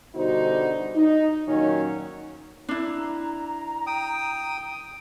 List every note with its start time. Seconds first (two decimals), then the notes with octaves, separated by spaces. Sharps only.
0.15 B2 D3 G3 D#4 F#4 C5
0.95 D#4
1.48 A#2 D#3 F#3 C#4 D#4
2.69 D4 E4
2.85 A#5
3.87 G5 D#6